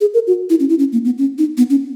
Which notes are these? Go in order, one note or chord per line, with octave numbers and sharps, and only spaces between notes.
G#4
A#4
F#4
E4
C#4
E4
C#4
A#3
B3
C#4
D#4
B3
C#4